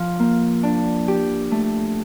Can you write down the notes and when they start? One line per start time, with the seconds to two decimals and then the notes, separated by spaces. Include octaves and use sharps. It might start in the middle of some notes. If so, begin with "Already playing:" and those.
Already playing: F3
0.19 A#3
0.63 D4
1.08 G4
1.52 A3